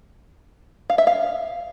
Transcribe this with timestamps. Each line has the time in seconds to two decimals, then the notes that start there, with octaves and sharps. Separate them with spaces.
0.90 F5
0.98 E5
1.07 F5